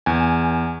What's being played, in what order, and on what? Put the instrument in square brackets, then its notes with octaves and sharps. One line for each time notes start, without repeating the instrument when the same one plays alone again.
[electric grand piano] E2 G#5